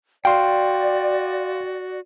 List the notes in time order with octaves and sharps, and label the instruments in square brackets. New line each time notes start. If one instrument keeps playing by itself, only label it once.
[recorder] F#4 [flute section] D5 [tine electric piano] F5 C6 [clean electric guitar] G5